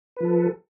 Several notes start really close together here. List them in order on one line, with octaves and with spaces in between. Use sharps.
B4 F3 A4